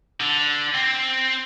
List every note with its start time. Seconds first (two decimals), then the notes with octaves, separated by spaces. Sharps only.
0.20 D3
0.75 C4